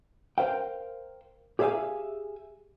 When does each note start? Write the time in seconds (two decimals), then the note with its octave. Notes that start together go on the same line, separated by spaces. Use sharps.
0.38 A#4 C5 F5 G5
1.59 G4 G#4 C#5 E5 F5 G#5